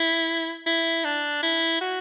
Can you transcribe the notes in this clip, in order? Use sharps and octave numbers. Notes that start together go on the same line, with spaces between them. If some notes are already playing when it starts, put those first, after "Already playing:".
Already playing: E4
E4
D4
E4
F#4